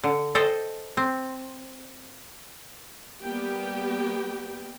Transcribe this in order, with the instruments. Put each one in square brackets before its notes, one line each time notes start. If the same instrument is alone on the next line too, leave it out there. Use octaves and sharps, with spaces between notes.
[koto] D3
A4 C5 D#5 G5
C4
[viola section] G3 A#3 B3 G4 G5